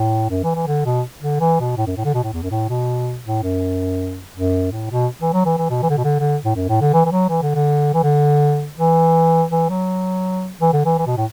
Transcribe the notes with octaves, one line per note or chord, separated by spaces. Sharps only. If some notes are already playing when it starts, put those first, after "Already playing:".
Already playing: A2
F#2
E3
E3
D3
B2
D3
E3
B2
A2
F#2
A2
D3
B2
A2
E2
F#2
A2
B2
A2
F#2
F#2
A2
B2
E3
F#3
E3
E3
B2
E3
D3
B2
D3
D3
A2
F#2
A2
D3
E3
E3
F#3
E3
D3
D3
E3
D3
E3
E3
F#3
E3
D3
E3
E3
B2
A2